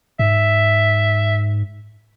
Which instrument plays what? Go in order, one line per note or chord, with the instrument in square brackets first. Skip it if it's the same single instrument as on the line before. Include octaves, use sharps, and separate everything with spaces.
[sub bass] G#2 [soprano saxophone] E5